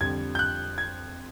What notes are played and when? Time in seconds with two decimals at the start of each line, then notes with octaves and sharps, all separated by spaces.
0.01 F2 D3 G3 G#6
0.35 G6
0.39 F#6
0.78 G#6